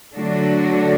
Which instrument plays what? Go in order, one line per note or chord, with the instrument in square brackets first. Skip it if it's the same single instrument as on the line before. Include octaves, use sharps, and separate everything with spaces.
[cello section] D3 F#3 A3 D4 F#4